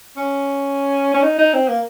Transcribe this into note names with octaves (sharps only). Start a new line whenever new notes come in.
C#4
C#4
D#4
D#4
C4
A#3